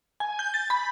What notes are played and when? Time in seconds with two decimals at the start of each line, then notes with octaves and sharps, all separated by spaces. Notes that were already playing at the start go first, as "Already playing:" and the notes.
0.20 G#5
0.39 G6
0.54 A6
0.70 B5